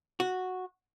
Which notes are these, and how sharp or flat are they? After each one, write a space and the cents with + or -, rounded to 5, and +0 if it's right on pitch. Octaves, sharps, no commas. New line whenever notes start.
F#4 -5